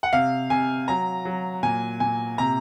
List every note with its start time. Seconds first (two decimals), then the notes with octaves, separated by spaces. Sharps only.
0.03 F#5
0.13 C3 F5
0.50 C3 G#5
0.88 F#3 A#5
1.25 F#3
1.63 A#2 G#5
2.00 A#2 G#5
2.38 C3 A#5